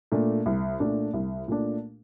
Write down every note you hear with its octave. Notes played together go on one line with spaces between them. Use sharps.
A#2 A3 D4
C2
A#2 A3 D4
C2
A#2 A3 D4